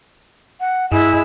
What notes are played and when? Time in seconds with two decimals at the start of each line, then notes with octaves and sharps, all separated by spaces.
0.60 F#5
0.92 G2 G#3 E4 E6